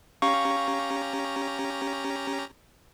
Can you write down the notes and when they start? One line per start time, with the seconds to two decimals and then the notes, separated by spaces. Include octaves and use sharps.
0.22 C#4 G4 F5 A#5 C#6